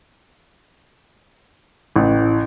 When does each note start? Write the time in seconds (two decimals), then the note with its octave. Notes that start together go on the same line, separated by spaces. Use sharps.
1.96 A1